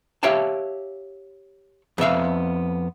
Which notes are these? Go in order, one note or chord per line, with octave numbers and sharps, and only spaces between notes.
G4 C#5 E5 F5 G5 A5
F2 B3 E5 F5